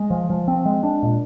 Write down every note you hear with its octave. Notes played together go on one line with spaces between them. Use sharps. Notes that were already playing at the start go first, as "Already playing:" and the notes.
Already playing: G#3
F3
F3
C4
G#3
D4
A#2